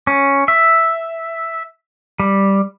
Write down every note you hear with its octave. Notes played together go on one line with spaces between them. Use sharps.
C#4
E5
G3